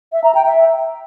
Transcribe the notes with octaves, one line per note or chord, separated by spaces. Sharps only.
E5
A#5
G5
E5